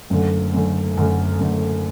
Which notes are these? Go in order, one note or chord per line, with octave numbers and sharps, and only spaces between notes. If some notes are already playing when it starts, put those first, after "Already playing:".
F#1 F#2 D3 A3
F#1 F#2 D3 A3
F#1 F#2 D3 A3
F#1 F#2 D3 A3